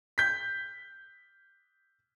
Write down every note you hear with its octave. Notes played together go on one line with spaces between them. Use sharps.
G6 B6